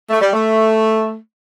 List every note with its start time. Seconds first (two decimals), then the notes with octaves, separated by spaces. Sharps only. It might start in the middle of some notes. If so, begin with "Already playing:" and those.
0.09 A3
0.20 G3
0.32 A3